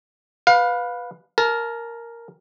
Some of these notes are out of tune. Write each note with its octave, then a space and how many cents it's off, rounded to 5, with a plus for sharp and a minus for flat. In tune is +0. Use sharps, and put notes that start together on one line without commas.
B4 +0 F5 +25
A#4 +0 A5 -30